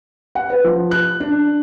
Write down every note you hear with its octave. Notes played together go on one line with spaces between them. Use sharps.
F#5
B4
F3
F#6
D4